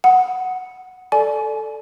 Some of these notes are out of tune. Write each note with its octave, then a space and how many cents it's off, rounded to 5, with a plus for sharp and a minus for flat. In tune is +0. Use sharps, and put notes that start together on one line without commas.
F#5 +0 D#6 +20
A4 +0 D5 +0 G#5 +30